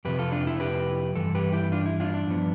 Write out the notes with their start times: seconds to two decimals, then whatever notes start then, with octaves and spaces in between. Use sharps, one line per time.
0.05 F2 C3 F3 G4 B4
0.19 F4 A4
0.32 D4 F4
0.47 E4
0.60 G4 B4
1.15 G2 E3 A4
1.35 G4 B4
1.53 E4 G4
1.72 D4 F4
1.86 E4
2.00 D4 F4
2.14 D4
2.27 G2 F3 B3